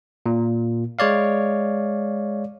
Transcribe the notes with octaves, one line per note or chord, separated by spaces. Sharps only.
A#2
G#3 C#5 D5 F5